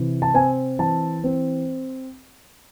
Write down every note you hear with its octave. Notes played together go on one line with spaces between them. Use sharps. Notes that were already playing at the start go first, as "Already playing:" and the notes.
Already playing: C3 E3
A5
C4 G#5
E3 A5
C4